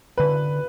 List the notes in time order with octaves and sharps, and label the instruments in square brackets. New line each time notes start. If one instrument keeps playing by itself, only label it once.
[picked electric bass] D3 [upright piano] B4